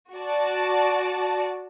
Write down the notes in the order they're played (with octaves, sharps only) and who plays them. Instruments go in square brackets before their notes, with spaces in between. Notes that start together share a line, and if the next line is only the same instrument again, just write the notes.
[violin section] F#4 D5 A5